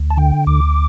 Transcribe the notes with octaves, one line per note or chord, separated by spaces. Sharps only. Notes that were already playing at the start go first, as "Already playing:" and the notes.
Already playing: D2
A5
D3 G5
D2 D6